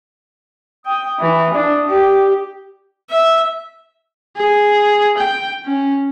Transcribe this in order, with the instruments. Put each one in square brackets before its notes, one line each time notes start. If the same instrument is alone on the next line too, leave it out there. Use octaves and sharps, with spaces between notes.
[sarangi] G5 [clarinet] D#6
[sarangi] E3
D4
G4
[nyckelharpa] E5
[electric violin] G#4
G5
C#4